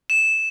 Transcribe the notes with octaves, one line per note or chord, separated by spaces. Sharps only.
E7